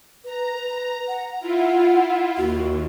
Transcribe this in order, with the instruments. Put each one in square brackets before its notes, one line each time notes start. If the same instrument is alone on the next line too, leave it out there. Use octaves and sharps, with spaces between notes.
[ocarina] B4 [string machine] A#5
[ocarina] B4
F#5
[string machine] E4 F4 [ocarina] F#5
[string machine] D#2 [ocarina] F#4